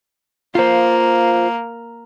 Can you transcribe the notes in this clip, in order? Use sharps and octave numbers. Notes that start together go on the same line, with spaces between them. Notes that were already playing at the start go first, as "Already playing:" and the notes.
A#3 F4 C5